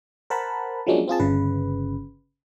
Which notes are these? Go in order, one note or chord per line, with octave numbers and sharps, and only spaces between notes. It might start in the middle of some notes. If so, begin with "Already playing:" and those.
A#4 C5 F#5 A5 B5
F3 F#3 G#3 A#3 C#4 D4
C4 F4 G#4 A5
G1 C#3 B4